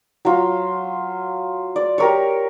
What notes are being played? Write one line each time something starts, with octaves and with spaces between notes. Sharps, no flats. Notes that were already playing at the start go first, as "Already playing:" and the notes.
F#3 F4
D5
G4 A#4 C#5